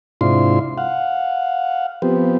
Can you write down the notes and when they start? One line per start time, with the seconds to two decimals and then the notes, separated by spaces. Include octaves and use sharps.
0.21 G#2 C3 D4 E4 F4 C6
0.78 F5 F#5
2.02 F3 B3 C4 G4